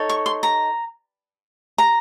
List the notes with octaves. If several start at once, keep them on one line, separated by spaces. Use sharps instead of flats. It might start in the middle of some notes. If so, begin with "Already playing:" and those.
Already playing: D#4 A4 C#5
C#6
C6
A#5
A#5